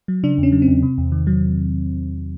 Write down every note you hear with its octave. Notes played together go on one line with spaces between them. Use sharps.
F#3
C#3 D4
E2
C#4
F#3
C4
E2
C3
E2
D#3
F#3